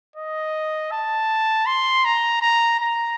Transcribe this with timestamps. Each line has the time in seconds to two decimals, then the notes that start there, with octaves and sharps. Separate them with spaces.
0.16 D#5
0.91 A5
1.66 C6
2.05 A#5
2.41 A#5
2.79 A#5